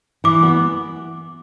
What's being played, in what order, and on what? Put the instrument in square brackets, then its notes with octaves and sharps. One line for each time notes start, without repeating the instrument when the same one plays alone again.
[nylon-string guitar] E3 [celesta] D6
[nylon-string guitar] B3